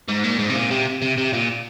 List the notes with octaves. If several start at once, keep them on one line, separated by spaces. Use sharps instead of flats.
G#2
A#2
G#2
C3
A#2
C3
C3
C3
A#2